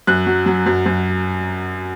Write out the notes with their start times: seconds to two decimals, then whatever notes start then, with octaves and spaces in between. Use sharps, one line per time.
0.07 F#2 F#6
0.26 F#3
0.46 F#3
0.66 F#2
0.86 F#2